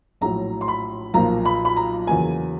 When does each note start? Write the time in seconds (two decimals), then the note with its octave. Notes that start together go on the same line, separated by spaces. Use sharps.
0.21 A#1 A2 F#3 A#5
0.61 C6
0.68 B5
1.14 B1 A#2 F3 A#3 A#5
1.45 B5
1.65 B5
1.77 A#5
2.07 E2 C#3 F#3 A#3 G#5